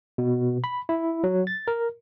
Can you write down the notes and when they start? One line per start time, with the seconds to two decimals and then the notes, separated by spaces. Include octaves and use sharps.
0.18 B2
0.64 B5
0.89 E4
1.24 F#3
1.47 A6
1.68 A#4